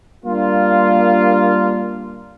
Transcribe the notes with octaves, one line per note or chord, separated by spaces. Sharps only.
G3 A#3 D4 F4